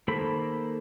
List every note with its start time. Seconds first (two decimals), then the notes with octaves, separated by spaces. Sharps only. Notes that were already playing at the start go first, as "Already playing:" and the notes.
0.08 D#3 A#3 A4 C5 B5